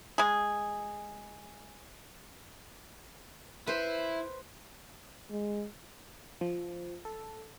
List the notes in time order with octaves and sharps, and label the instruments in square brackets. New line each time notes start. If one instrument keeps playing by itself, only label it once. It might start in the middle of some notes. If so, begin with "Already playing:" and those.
[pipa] G#3 G#4
[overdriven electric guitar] E4 [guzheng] B4 C5
[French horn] G#3
[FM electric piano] F3
A4